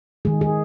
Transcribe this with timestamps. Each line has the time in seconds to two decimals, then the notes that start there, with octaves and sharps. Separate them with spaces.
0.25 D#3 G#3 G#4
0.41 G#4